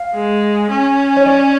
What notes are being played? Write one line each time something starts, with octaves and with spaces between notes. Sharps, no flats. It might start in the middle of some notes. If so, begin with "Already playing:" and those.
Already playing: F5
G#3
C#4
C#5
D5